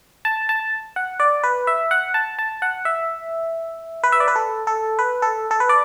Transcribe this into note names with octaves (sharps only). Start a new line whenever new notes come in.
A5
A5
F#5
D5
B4
E5
F#5
A5
A5
F#5
E5
B4
E5
D5
B4
A4
A4
B4
A4
A4
B4
D5